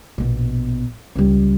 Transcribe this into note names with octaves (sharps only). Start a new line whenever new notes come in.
A#1 B2
C#2 G3